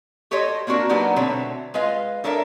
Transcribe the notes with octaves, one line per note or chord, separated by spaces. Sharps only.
F#4 G4 A4 C5 C#5 D#5
A#3 C4 D4 F#4 A#4
F#3 A#3 B3 D4 D#4 G4
B2 D3 A3 C4 C#5 E5
G#3 F4 B4 D#5 F5
D4 A4 A#4 C#5 D5 E5